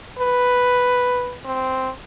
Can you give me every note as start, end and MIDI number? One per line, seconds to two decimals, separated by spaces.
0.19 1.35 71
1.45 1.90 60